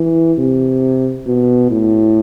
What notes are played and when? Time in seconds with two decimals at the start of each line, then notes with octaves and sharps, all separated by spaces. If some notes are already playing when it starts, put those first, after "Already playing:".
Already playing: E3
0.38 C3
1.27 B2
1.71 A2